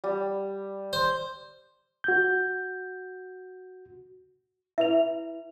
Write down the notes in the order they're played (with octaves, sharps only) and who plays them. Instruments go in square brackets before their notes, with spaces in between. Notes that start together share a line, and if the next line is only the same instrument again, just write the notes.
[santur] G3
[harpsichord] C5
[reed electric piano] F#4 G6
[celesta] E4 B4 F7 [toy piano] E5